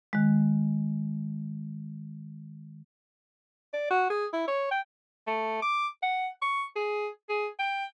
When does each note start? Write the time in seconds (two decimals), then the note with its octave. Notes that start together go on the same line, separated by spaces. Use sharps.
0.13 D#3 G#3
3.73 D5
3.90 F#4
4.10 G#4
4.33 E4
4.48 C#5
4.71 G5
5.27 A3
5.62 D6
6.02 F#5
6.42 C#6
6.76 G#4
7.29 G#4
7.59 G5